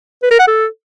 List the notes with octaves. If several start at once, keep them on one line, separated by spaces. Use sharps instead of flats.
B4
A#4
F#5
A4